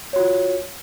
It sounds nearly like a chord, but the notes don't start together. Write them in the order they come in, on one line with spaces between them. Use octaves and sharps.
C#5 F#4 F4